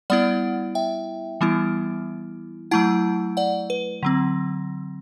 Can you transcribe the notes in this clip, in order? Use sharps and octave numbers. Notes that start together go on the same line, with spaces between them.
G3 B3 E4 D5 F#5
E5 G5
E3 G3 B3 E4
F#3 A3 E4 F#5 A5
D5 F#5
B4
D3 F#3 C4